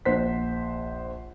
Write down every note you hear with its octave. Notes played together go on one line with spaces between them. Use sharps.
A#1 C5 F#5 B6